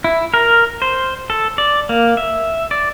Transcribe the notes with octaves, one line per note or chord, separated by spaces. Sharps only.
E4
A#4
C5
A4
D5
A#3
E5
D5